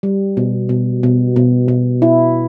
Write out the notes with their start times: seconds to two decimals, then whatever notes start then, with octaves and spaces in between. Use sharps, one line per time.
0.03 G3
0.37 B2
0.69 B2
1.03 B2
1.36 B2
1.68 B2
2.02 E4